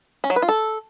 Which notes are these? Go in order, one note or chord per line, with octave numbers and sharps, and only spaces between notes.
C#4
F#3
B4
F4
A4